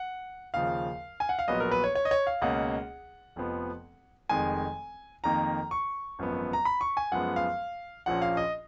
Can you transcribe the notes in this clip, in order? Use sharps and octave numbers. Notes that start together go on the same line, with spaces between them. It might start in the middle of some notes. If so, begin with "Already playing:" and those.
Already playing: F#5
D#2 C#3 F3 F5
G#5
F#5
F5
A#1 A#2 F#3 B3 D#5
A#4
B4
C#5
C#5
D#5
C#5
F5
C#2 B2 A#3 C#4 F#5
F1 F2 F3 B3
F1 F2 D#3 G#3 G#5
F2 D#3 A#3 A#5
C#6
G#1 F#2 F3 B3
A#5
B5
C#6
G#5
F#2 F3 G#3 B3 F#5
F5
A#1 A#2 F3 A#3 C#4 F#5
F5
D#5